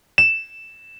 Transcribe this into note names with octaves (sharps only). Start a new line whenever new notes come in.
E7